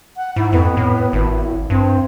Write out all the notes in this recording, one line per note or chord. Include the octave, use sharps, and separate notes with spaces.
F#5
G#2 E4
F2 B3
A2
G#1 E4
G2 C4